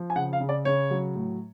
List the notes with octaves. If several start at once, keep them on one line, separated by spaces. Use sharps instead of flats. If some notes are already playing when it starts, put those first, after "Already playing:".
Already playing: F3
G#5
C#3 F#5
F5
C#3
D5
C#3 C#5
F#3
A2